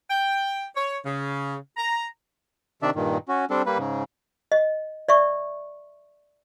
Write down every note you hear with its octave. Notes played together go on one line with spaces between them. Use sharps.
G5
C#5
C#3
A#5
C3 D#3 D4 D5 E5
G2 A#2 D#3
C#4 F#4
G3 C4 D4 A4
G3 A#3 B4
G#2 C#3
D#5
D5 E5 C#6